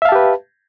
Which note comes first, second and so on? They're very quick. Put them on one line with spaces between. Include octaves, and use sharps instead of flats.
E5 F5 A5 G4 B4